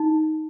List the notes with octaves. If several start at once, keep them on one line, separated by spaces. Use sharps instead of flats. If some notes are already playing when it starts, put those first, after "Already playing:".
Already playing: D#4